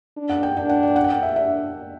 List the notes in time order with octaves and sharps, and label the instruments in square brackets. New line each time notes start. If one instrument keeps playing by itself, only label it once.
[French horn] D4
[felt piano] F#5
G5
[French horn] D4 [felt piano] G5
[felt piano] F#5
G5
F#5
G5
F#5
E5
[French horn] D4 [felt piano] E5